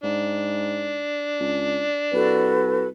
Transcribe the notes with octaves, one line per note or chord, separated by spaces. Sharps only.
G#2 D4
C#2
C2 F#4 A4 B4